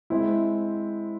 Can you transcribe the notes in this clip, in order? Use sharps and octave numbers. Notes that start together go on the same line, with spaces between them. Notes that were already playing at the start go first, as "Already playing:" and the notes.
G#3 C4 E4